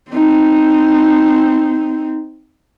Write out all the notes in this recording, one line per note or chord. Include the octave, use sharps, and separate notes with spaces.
C4 D#4